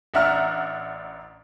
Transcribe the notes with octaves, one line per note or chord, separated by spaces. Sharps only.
A1 D4 E5 F#5 A#5 F6